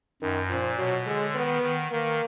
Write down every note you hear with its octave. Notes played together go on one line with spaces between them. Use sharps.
F#2 D#3
A#2 F3
B2 F#3
D3 G#3
D#3 B3
D#3
D#3 A#3